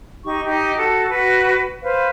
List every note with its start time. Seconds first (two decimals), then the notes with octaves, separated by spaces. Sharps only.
0.24 D#4 G4 C#6
0.46 D#4 G4
0.77 F#4 A4
1.09 F#4 B4
1.82 B4 C5 F5